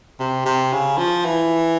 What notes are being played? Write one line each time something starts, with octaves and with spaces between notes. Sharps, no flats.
C3
C3
C#3
F3
E3